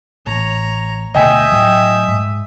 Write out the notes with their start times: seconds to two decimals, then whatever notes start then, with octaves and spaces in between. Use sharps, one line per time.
0.27 A1 C#5 A#5
1.15 D2 B2 A3 D#5 E5 G5 G#5 D#6
1.52 A2 F#3
2.08 G#2